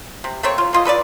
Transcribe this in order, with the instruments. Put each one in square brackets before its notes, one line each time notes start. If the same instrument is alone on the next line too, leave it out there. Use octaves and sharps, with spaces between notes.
[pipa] C3
A3 A#3 C4 C#5
F4
A#3 F4 D#5
A4 B4 C#5 D5